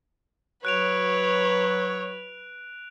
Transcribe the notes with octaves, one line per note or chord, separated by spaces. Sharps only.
F#3 B4 C#5 F#6 D7 F7